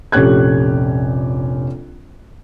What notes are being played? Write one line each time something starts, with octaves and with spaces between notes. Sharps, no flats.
F1 A#1 C#4 G4 F#6 G#6